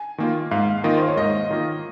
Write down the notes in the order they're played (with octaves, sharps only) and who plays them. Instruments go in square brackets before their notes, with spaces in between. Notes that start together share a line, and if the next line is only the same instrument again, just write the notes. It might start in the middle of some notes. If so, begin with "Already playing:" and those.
Already playing: [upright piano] G#5
[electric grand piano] D#3 A#3 F4
[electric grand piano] G#2 [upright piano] F5
[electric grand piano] D#3 A#3 F4 [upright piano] D#5
[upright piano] C5
C#5
[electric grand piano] G#2 [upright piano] D#5
[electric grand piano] D#3 A#3 F4